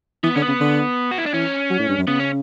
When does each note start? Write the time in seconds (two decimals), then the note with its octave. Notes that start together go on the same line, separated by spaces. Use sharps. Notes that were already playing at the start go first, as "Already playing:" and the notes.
0.23 E3 B3
0.36 D3 C#4
0.42 B3
0.48 C#3
0.60 D3
1.11 F#4
1.18 E4
1.26 D4
1.33 E3 C#4
1.70 F#3
1.79 A2
1.89 G2
1.98 F#2
2.07 C#3 B3
2.19 C#4